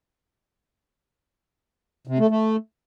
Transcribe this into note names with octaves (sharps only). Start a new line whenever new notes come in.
C3
A3
A3